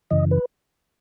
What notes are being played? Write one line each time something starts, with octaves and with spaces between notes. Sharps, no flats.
F#2 C#3 E3 D#5
B4